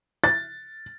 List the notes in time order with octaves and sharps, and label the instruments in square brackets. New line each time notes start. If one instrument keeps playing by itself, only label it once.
[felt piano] A6